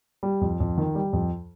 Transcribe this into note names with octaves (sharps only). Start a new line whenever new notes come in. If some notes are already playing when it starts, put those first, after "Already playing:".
G3
F2
F2
D#3
G3
F2